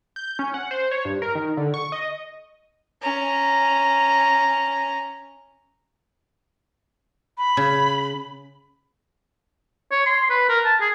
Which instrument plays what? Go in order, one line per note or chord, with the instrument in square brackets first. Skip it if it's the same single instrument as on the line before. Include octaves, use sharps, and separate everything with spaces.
[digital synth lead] G6
C#4
F#5
C5
C#5
G2
A#4
D#3
D3
C#6
D#5
[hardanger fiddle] C#4 A#5
[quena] B5
[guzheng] C#3
[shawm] C#5
C6
B4
A#4
A5
G#4